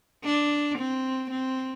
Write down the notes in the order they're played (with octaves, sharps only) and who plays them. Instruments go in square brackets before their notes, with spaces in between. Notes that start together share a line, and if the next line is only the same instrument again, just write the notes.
[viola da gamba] D4
C4
C4